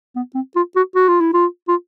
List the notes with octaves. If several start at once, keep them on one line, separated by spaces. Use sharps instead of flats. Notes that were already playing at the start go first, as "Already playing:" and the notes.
B3
C4
F4
F#4
F#4
F4
E4
F4
F4